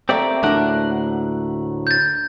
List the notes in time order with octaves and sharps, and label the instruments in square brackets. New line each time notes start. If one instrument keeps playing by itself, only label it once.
[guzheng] A3 A#3 [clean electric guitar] C4 G4 D5
[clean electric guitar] D2 A2 F#5 [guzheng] D4 A#4
[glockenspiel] G6 A6